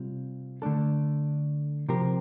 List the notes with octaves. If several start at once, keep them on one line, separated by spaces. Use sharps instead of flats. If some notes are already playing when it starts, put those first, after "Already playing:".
Already playing: C3 G3 F4
D3 A3 D4 A4
C3 F3 C4 G4 A#4